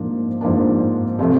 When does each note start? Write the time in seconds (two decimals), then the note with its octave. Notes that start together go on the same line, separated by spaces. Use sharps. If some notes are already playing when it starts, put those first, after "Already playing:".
Already playing: G#2 F3 A#3 D4
0.41 G#2 F3 A#3 D4
1.19 C3 F3 A3